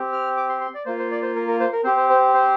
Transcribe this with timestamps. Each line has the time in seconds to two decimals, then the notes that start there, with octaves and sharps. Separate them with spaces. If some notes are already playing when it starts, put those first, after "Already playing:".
Already playing: C4 G4
0.12 F6
0.37 D6
0.49 C6
0.61 C6
0.74 D5
0.86 A#3 F4 C5
0.99 C5
1.11 D5
1.22 C5
1.36 A#4
1.48 A#4
1.60 C5
1.72 A#4
1.84 C4 G4 C5
1.97 C5
2.10 C5
2.34 C5